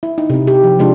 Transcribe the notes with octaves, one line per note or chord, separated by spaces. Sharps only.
E4
D#4
C3 C4
G4
F3
C3 G#3 D4 F4